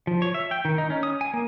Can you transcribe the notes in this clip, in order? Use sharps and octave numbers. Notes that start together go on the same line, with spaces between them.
F3
C#5
E5
G5
D#3
D#4
C#4
D#6
G#5
A#3